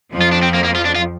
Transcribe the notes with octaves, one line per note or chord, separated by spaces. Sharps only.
F2 F3
F4
D4
C4
A#3
A#3
F4
D4
F4